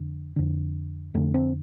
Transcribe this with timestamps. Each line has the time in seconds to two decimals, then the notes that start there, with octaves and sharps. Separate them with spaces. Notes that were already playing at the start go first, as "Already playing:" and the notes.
Already playing: F2 D3
0.36 F2 D3
1.14 F2 D3 A3
1.34 C4